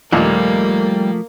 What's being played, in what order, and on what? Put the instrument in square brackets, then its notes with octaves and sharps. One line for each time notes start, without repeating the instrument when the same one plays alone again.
[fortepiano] D#2 A#2 [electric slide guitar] F3 A3 [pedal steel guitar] G3 [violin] A#3